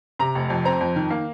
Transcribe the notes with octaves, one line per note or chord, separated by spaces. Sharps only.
C3 A#5
F1
F2
C4 A#5
F2
D#3
A#3